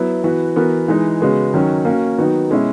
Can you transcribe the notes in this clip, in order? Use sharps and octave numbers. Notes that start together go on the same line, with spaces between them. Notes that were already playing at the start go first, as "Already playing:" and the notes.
Already playing: F#3 B3 E4
E3 B3 F#4 B4
E3 B3 F#4 A#4
E3 G#3 D#4
C#3 G#3 B3 F#4
D#3 F#3 C#4 F#4
A#3 C#4 F#4
D#3 F#3 B3 D#4 F#4
B2 G#3 C#4 E4